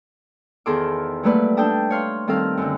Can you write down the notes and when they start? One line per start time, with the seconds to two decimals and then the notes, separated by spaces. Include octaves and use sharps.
0.66 E2 D#3 G#4 A4 C6 D6
1.23 F#3 G3 A3 A#3 B4 D5
1.57 D4 A4 G5 A5 D#6
1.90 C#5 F5 C6
2.28 D#3 G3 C4 A4 F5
2.57 F#2 D3